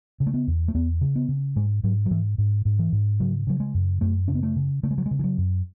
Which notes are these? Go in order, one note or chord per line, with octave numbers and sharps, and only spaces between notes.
C#3
A3
B3
E2
A3
E2 B3
C#3
B3
C#3
G#2 G#3
G#2 F#3
F#3
G#2 E3
G#2
G#2
E3
G#2
C#3 F#3
C#3 F#3
G#3
F#2
F#2 A3
C#3 C#4
B3
A3
C#3
C#3 A3
G#3
F#3
G#3
C#3
E3
F#3
F#2